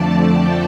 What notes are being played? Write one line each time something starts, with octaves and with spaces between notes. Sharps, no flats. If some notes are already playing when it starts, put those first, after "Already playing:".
Already playing: F2 D3 F3 A3 D5 A5
G5